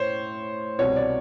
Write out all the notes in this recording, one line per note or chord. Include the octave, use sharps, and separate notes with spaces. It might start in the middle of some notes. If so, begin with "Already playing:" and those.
Already playing: A2 C5 C#5
C2 B2 G3 C4 C#5
D5